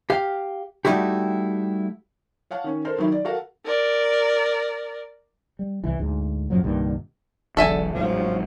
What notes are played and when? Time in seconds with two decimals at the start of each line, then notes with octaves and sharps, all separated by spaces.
0.10 G4 F5
0.85 G3 A3 D#4 E4 F#4 G4
2.51 C#5 F5 F#5 A5
2.64 D#3 C#4
2.85 A4 A#4 C5
2.98 D#3 F#3 D#4 E4
3.12 D5
3.25 F#4 A4 A#4 F5 F#5
3.65 A#4 D5
5.59 G3
5.84 C2 E3
5.99 D2 G#2
6.50 F#2 A2 F3 F#3
6.64 C2 G2 A#2 D#3
7.57 E1 B1 E2 D3 A4 E5 G#5
7.95 A1 E2 G#2 F3 F#3